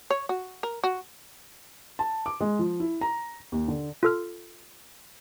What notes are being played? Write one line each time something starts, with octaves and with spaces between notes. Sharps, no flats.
C#5
F#4
A#4
F#4
A5
D6
G#3
F3
E4
A#5
D#2
D3
F4 A4 F6